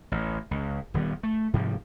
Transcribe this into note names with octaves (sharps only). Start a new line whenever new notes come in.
A1
C#2
D#1 D#3 G3 B3
A3
G#2 C3 F3 G3